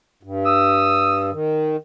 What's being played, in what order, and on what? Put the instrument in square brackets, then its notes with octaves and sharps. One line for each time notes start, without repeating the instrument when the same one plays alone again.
[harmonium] G2
[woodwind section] D#6 E6
[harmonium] D#3